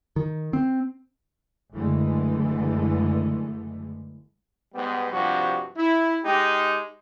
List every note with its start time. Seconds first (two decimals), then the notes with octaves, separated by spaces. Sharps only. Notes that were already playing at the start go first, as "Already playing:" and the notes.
0.16 D#3
0.53 C4
1.74 F#1 D3 E3 G#3 A3
4.74 G#2 G3 B3
5.12 G2 C3 F3 F#4
5.77 E4
6.24 G#3 D#4 G4